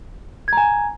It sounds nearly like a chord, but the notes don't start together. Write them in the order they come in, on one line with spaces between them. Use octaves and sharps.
G#6 A#5 G#5